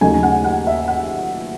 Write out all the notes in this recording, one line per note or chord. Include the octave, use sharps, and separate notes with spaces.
D#2 C#3 F#3 A3 D#4 G#5
F#5
F#5
E5
F#5